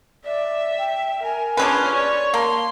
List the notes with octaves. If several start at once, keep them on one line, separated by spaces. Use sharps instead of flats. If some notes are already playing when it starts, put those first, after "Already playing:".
D5 E5
G5
A#4 G#5
C#4 D4 F4 G#4 B4
C#5 D5
A#3 A5 C6